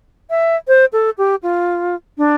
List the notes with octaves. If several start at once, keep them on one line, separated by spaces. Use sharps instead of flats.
E5
C5
A4
G4
F4
D4